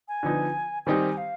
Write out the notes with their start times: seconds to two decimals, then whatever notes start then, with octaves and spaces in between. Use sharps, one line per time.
0.08 G#5
0.23 D3 F3 B3 D#4
0.86 D#3 G3 C4 D#4 G4 G#5
1.17 F5